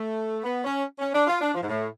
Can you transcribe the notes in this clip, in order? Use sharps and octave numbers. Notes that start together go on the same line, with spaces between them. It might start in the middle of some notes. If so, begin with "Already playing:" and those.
Already playing: A3
B3
C#4
C#4
D4
F4
D4
F3
G#2
A2